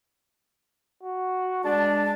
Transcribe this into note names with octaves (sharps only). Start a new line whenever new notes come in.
F#4
G#3 D4 A5